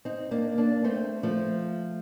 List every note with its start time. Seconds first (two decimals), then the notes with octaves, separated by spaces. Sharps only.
0.05 C4 D#4
0.31 A#3 D4
0.58 A#3 D4
0.84 A3 C4
1.23 F3 A3